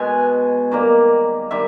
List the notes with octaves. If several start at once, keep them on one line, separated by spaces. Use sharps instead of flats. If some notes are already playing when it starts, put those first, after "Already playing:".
Already playing: B2 G#3 G#5
D#3 G3 A#3
D#3 G3 E5